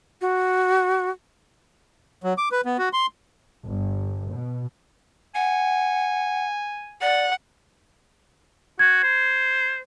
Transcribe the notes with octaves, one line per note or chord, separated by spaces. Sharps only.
F#4
F#3
D6
B4
B3
F#4
C6
G1
B2
F#5 G#5
D5 F#5
F#4 G#6
C5